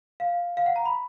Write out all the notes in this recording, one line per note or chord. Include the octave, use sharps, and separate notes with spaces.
F5
F5
F#5
A#5
B5